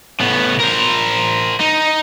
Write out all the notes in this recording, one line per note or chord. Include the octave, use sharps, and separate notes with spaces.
A2 B3
A#4 C5
D#4